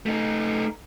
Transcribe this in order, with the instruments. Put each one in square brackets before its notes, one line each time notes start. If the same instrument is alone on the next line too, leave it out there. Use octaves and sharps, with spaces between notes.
[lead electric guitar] A3 D#4